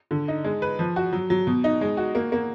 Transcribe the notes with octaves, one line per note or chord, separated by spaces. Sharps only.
D3
D#4
G#3
B4
F3
F#4
F#3
F#3
B2
D#4
G#3
F#4
A#3
A#3